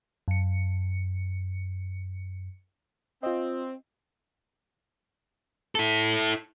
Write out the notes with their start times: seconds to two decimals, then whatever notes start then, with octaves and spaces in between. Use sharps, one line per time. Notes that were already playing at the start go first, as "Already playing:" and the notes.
0.28 F#2 C#7
3.23 C4 F4 D#5
5.75 E4 A4